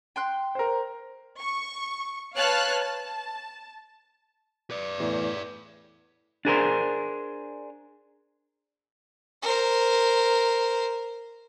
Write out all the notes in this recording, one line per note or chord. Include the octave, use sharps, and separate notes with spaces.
G5 C6 F#6
A#4 C5
C#6
B4 C#5 F5 A5 F6 F#6
A5
B4 D5
E2 A2
D4 G#4 A#4 C5
A#4 C5